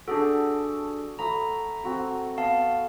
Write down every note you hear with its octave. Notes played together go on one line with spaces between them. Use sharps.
D4 F#4 G#4 A4 D5
A3 A#5 B5 D#6
C4 F#4 E6
B3 F5 A5